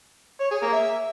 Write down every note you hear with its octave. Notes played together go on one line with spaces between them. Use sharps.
C#5
G#4
A#3
E5